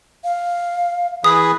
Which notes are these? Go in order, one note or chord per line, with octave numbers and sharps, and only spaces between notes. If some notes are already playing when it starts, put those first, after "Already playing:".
F5
E3 G#4 B4 D#6